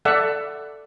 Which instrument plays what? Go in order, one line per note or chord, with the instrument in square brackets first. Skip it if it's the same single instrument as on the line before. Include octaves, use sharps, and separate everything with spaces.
[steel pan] A4 D5 E5 F#5